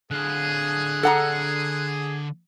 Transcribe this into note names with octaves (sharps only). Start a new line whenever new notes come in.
D3 G#4 F5 F#6
A4 F#5 A#5